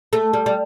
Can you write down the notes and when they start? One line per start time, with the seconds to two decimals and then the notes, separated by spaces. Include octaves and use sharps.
0.13 A3
0.33 G3
0.46 G3